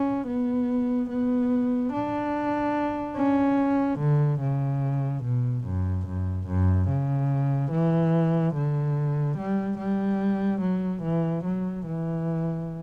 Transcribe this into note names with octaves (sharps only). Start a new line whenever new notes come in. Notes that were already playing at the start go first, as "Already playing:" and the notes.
Already playing: C#4
B3
B3
D4
C#4
D3
C#3
B2
F#2
F#2
F#2
C#3
E3
D3
G3
G3
F#3
E3
F#3
E3